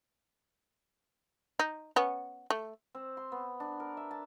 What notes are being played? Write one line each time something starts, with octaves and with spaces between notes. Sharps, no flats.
D#4
B3 C#4
A3
C4
C6
B3
D4
A#4
E5
A5